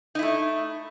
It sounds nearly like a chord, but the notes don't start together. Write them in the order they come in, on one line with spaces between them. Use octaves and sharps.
D#4 E4 A3